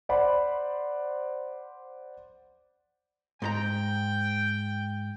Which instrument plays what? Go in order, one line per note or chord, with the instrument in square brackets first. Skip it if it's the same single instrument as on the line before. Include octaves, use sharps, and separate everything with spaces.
[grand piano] C5 D5 F#5 B5
[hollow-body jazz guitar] G#2 A4 A#5 [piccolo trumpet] G5